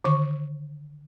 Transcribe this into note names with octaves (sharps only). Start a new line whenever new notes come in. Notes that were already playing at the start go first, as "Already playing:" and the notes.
D3 D#3 C#6